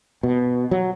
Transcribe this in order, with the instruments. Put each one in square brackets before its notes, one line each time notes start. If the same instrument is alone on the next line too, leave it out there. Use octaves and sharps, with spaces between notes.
[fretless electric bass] B2
F#3